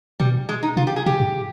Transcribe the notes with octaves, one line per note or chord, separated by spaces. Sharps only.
B2 G3
G#3
D#4
C3 F4
G4
G#4
C3 G4
G#2